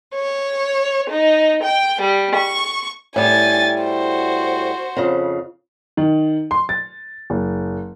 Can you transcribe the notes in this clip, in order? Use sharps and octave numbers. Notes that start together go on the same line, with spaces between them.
C#5
D#4
G5
G3
C#6
A2 G3 G#5 A6
F#4 C5
F2 C#3
D#3
C6
A6
F#1